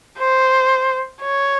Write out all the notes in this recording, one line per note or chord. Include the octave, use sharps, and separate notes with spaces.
C5
C#5